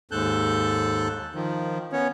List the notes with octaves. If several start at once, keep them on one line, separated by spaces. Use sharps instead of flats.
D#2 G#2 A4 A5 F#6 G6
D#3 F3
B3 C#4 C#5